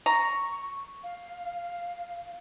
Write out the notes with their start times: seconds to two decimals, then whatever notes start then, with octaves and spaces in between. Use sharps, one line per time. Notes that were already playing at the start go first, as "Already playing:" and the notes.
0.06 A#5 C#6
1.03 F5